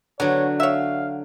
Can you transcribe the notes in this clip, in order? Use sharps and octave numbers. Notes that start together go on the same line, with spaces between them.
D3 F#3 B3 C#5
C#5 E5 F5